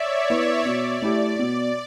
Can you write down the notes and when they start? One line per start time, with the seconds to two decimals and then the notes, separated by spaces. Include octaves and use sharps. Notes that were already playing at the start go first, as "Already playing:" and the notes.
Already playing: C#5 D5 E5
0.30 B3 E4
0.65 B2 D5
1.02 A3 E4 G4
1.39 B2